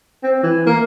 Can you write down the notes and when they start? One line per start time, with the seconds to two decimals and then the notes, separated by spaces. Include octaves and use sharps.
0.23 C4
0.43 E3
0.66 A#3